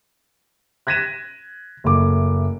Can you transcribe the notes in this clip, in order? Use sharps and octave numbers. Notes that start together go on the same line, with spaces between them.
F#6 G#6 A#6 B6 D#7 E7
F#1 A3 D6